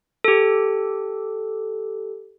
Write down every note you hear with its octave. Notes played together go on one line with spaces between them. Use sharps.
G4 A4